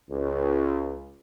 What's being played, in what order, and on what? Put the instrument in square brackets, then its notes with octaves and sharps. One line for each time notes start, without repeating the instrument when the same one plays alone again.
[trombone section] C#2